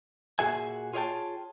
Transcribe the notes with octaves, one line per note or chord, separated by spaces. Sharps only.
A#2 F#4 G#4 E5 G#5
F4 G#4 C#5 D#5 G5 A5